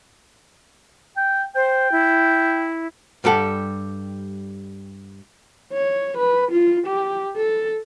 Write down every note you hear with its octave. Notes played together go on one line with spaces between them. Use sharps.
G5
C5 G5
E4
G2 G3 G4 A4 F#5
C#5
B4
F4
G4
A4